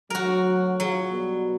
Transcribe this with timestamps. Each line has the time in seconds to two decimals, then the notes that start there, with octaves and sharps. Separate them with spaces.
0.10 D2 F#3 F#4 A#4
0.80 F#3 F4 G#4
1.11 B2 G3 B3